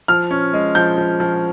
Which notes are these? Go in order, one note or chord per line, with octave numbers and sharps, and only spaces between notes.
F3 F6
C#4
G#3
F3 G6
F3
F3